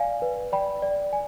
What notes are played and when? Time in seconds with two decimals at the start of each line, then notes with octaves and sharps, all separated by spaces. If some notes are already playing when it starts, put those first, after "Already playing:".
Already playing: D5 F5 G#5
0.22 B4
0.52 D5 G5 B5
0.82 D5
1.13 G#5